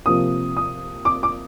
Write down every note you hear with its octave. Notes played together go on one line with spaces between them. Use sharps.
C3 F3 A#3 D#6
D#6
D6
D6